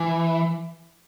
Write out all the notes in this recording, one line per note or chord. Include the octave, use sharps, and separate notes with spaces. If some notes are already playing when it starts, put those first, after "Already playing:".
Already playing: E3